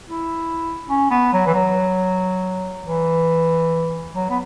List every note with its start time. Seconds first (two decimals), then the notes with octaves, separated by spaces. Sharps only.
0.09 E4
0.89 C#4
1.11 B3
1.33 F#3
1.47 E3
1.54 F#3
2.85 E3
4.14 F#3
4.30 B3